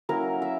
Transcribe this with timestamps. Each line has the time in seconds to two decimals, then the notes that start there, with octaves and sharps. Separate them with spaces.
0.09 F#3 A#3 C#4 E4 A#4
0.42 E5